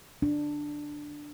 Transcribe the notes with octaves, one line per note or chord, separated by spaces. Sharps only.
D4